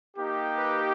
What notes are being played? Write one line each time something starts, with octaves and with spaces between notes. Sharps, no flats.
A#3 D#4 G4
B4